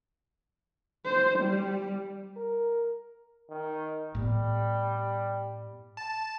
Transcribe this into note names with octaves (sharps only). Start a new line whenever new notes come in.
C5
G3
A#4
D#3
A2 G3 B3
A5